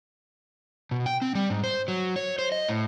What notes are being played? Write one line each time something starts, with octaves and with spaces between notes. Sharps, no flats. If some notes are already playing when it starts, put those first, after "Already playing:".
B2
G5
C4
G3
G#2
C5
F#3
C#5
C5
D#5
A2